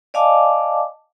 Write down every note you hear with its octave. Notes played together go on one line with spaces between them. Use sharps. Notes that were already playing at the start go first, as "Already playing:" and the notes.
D5 D#5 F5 G#5 A5 D6